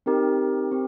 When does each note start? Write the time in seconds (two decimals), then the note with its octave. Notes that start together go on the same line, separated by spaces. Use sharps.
0.06 C4 D#4 G4 A#4
0.71 C4 G4